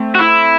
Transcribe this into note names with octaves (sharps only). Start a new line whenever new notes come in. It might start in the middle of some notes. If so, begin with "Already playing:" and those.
Already playing: A3 C4
F#4
E4